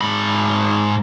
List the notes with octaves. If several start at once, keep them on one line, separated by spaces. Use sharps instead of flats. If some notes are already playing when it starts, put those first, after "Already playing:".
G#2 B5